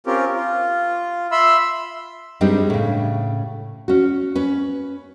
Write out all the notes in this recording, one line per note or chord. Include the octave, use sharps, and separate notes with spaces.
C4 C#4 F4 G4 A#4
F4
E5 B5 C6 E6
G2 G3 G#3 C4 D4 D#4
A2 C#3
C#4 F#4
C#4 B4